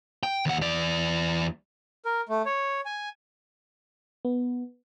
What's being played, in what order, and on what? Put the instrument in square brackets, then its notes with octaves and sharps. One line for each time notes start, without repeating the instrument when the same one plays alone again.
[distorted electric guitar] G5
D#2 F#5
E2 D5
[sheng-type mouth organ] A#4
A3
C#5
G#5
[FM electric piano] B3